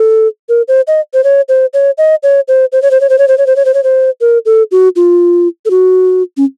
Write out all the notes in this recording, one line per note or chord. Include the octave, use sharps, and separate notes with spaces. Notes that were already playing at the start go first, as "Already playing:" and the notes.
Already playing: A4
A#4
C5
D#5
C5
C#5
C5
C#5
D#5
C#5
C5
C5
C#5
C5
C#5
C5
C#5
C5
C#5
C5
C#5
C5
C#5
C5
A#4
A4
F#4
F4
A4
F#4
C#4